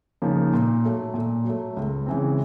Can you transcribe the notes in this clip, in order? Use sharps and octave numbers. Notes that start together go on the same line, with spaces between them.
C#3 F3 A#3 D#4
A#2
F#3 A3
A#2
F#3
A3
C#2
C#3 E3 G#3 C4